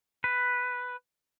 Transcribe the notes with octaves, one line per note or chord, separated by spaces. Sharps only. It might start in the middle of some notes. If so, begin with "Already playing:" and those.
B4